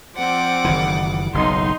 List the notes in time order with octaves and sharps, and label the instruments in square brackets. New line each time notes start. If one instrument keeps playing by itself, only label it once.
[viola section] F3 C4 [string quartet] D5 F#5 D6
[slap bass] F#1 D#3 E3
[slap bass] F#1 B1 [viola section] D#4 C6